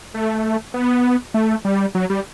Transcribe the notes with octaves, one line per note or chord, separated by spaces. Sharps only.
A3
B3
A3
G3
F#3
G3